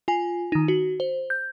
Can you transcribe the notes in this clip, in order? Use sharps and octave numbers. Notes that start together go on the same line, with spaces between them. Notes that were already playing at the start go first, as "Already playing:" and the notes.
F4 G#5
D#3 D#4
F#4
C5
G6